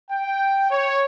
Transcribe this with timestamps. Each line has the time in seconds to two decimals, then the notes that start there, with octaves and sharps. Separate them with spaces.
0.10 G5
0.71 C#5